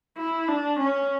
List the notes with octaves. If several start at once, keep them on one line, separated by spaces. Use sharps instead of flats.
E4
D4
C#4